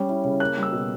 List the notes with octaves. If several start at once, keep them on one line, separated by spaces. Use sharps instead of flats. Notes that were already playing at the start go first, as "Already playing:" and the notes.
Already playing: G3 C#4
E4
C#3
A#3 F#6
G3
E6
B2